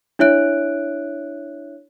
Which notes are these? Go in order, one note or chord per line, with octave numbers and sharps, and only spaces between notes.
D4 E4 C#5 E5 F#6 D7